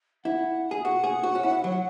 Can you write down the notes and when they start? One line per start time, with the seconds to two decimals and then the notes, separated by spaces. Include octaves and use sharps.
0.25 E4 F#5
0.71 G#4
0.84 F#4 F#5
1.04 G#4
1.23 F#4
1.35 C#4
1.43 E4
1.64 F#3